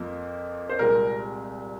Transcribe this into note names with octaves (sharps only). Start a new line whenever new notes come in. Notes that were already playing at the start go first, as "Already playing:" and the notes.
Already playing: F2 F3 A#3
C5
C2 A#2 G#3 A#4